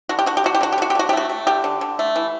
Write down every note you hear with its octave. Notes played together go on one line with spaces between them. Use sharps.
D3 F#4
G4
D3 F#4
G4
D3 F#4
G4
D3 F#4
G4
D3 F#4
G4
D3 F#4
G4
A3 F#4
A3
D3 G4
D3
D3
A3
E3